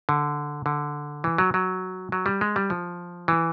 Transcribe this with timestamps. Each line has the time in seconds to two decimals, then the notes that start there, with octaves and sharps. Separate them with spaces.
0.09 D3
0.66 D3
1.24 E3
1.38 F#3
1.54 F#3
2.12 F#3
2.26 G3
2.41 G#3
2.56 G3
2.70 F3
3.28 E3